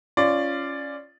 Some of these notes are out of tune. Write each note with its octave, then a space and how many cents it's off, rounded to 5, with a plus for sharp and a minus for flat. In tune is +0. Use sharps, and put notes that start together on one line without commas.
C#4 +0 F4 -15 D5 +5